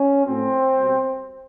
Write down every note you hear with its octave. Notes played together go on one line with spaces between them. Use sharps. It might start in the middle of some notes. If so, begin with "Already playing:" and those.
Already playing: C#4
A2 F#3 C4
B2 G3